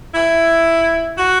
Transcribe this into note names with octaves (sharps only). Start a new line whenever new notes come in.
E4
F#4